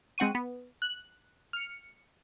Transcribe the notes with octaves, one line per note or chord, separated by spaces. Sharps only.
G#3 C4 F#5 C#6 D#7
B3
F#6
F6 C#7